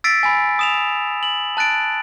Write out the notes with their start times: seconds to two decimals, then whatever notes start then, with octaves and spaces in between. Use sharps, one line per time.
0.04 E6 A6 B6 C7 D7
0.23 G#5 B5
0.59 D#6 E7 F7
1.23 F#7
1.57 A5 F#6 A6 D7